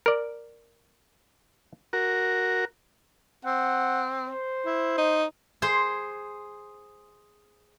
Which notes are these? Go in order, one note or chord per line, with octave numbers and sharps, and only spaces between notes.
A#4 D5
F#4 A#4
C4 F#5
C5
E4
D#4
G#4 C5 C6